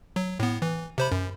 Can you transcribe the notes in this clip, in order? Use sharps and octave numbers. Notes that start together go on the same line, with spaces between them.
F#3
A2 B3
E3
C3 C5 B5
F#2